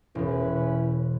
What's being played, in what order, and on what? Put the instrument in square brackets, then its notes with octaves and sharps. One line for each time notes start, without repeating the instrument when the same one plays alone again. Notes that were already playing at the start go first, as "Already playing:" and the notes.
[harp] E1 B2 [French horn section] C#4 E4 B4